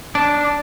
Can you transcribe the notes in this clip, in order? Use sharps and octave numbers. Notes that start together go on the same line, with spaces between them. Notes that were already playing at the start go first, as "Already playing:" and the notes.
D4